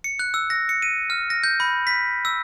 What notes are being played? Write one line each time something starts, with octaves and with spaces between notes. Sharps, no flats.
C#7
F#6
E6
A#6
C#7
D#7
F6
A#6
G6
B5
B6
E6